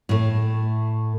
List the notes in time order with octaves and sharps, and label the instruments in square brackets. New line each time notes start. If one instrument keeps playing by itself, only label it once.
[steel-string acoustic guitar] A2 A3